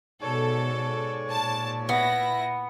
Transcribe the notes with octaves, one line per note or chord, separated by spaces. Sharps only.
G#2 B2 A4 C#5 D5
A#2 A5
B3 E4 A#6